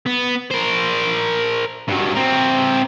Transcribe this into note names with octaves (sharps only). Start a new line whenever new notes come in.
B3
A#4 C5
G2 F#3
C4 A#4